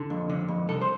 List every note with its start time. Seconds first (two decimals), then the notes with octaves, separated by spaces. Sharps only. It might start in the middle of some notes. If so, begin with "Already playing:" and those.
Already playing: D3
0.10 F2
0.30 D3
0.48 F2
0.69 C2 A4
0.81 C5